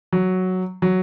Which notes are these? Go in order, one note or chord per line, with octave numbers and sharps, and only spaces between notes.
F#3
F#3